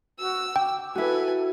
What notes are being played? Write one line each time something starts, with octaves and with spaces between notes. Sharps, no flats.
F#4 E6
G5 D6
E4 F#4 A4 B4 G#5